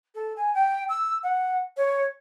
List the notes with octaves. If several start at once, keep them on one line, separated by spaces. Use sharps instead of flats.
A4
G#5
G5
E6
F#5
C#5